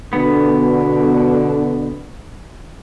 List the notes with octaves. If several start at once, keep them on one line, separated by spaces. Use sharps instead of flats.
B2 D3 B3